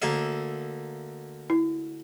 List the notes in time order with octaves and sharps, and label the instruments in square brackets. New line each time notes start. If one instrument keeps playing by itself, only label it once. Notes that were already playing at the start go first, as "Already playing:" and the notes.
[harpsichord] D2 A#3 E5
[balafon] E4